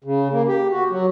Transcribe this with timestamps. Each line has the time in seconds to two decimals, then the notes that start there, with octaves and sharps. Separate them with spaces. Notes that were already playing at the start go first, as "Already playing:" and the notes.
0.04 C#3
0.31 A#3
0.48 G4
0.71 F#4
0.91 F#3